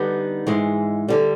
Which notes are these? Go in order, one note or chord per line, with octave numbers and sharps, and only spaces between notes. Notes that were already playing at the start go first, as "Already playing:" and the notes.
Already playing: D3 G3 B3 D#4
G#2 E3 G#3
D3 G3